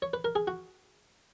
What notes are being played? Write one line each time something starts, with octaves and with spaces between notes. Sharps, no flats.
C#5
B4
A#4
G#4
F#4